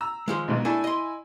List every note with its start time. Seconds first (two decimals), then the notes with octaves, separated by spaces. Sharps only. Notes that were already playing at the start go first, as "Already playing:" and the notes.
0.01 A#5 E6
0.28 D#3 F3 G#3
0.48 B1 G#2 B2
0.65 A3 D4 E4 A4 G#5
0.84 D#5 C6